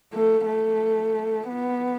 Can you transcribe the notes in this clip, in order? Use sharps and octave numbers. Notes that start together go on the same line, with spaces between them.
A3
A3
B3